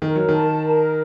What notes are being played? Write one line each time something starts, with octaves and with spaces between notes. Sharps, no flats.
D#3 A#4
F#3
D#3 A5
A#4